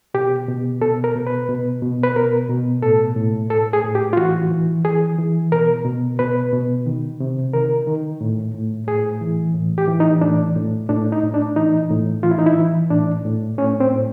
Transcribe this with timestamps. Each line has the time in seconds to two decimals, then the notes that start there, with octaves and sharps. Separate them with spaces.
0.14 B2 G4
0.48 B2
0.82 B2 A4
1.04 A#4
1.16 B2
1.27 B4
1.49 B2
1.82 B2
2.03 B4
2.16 B2 A#4
2.50 B2
2.83 A2 A4
3.16 A2
3.50 A2 A4
3.73 G#4
3.85 A2
3.95 G4
4.13 F4
4.17 E3 F#4
4.51 E3
4.85 E3 G#4
5.18 E3
5.52 B2 A#4
5.85 B2
6.19 B2 B4
6.53 B2
6.86 D#3
7.20 C3
7.53 D#3 A#4
7.87 D#3
8.21 A2
8.54 A2
8.87 A2 G#4
9.21 E3
9.54 A2
9.78 G4
9.88 E3
10.00 D#4
10.21 A2 D4
10.56 A2
10.89 A2 D4
11.12 D#4
11.23 A2
11.34 D4
11.56 E3 D#4
11.90 A2
12.23 E3 F4
12.31 E4
12.38 D#4
12.46 E4
12.58 E3
12.90 A2 D4
13.25 A2
13.58 A2 C#4
13.80 C4
13.91 A2